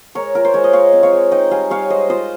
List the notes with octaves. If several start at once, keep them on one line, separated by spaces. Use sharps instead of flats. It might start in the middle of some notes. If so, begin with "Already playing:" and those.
G#3 A#4 C#5
F4 A#4
C5
G#3 C#5
D#5
G#3 C#5 F5
C4
C#5 F5
G#3
D#4 D#5 G5
G3 F5 G#5
G3 C#5 F5
G#3 C5 D#5
F4 C5 D#5